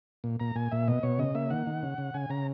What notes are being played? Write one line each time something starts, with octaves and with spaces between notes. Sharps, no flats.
A#2
A#2 A#5
A#2 G#5
A#2 E5
B2 D#5
B2 C#5
C#3 D#5
A#3 E5
D#3 F#5
D#3
C#3
C#3
C#3 G#5
C#3 A#5